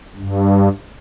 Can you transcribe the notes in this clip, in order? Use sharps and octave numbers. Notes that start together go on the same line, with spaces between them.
G2